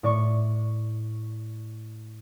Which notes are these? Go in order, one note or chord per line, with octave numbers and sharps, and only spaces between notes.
A2 D5 C#6